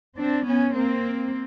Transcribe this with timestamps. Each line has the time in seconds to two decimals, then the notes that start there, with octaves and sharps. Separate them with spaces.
0.18 C4 D4
0.47 B3 C#4
0.74 A#3 C4